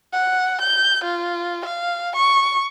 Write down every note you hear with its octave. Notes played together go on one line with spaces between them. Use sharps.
F#5
G6
F4
F5
C#6